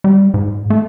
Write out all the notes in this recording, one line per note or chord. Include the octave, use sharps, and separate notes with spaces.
G3
G#2
A3